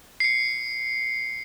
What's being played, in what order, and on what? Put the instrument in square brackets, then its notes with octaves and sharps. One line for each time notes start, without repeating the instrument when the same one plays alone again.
[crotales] C7 C#7